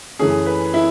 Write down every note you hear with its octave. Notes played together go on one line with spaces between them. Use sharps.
F#2 E3 A3 C#4 G#4
B4
E4